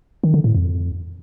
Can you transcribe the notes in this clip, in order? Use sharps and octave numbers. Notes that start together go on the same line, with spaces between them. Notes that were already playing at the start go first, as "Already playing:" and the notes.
D#3
D3
A2
F2